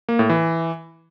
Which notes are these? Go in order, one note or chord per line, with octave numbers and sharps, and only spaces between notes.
A#3
A2
E3